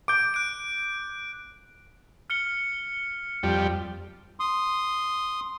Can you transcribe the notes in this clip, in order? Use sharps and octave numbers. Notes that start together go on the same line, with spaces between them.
D6 G6 D7
F#6 D7
F6 C#7 G7
F2 G3
C6 D#6